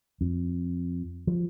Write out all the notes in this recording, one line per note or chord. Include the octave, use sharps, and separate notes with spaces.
F2
F3